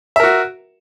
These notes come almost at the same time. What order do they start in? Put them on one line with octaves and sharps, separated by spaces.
E5 A#4 F#4